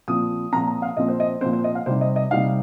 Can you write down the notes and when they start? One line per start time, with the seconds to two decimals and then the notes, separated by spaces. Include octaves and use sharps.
0.08 A#2 F3 C4 D#6
0.52 A#2 F3 C4 A#5
0.67 A#5
0.82 F5
0.97 A#2 F3 C4 D#5
1.08 C5
1.20 D#5
1.41 A#2 F3 C4 C5
1.53 C5
1.64 D#5
1.75 F5
1.86 C3 G3 D#4 C5
2.01 D#5
2.16 D#5
2.31 C3 G3 D#4 F5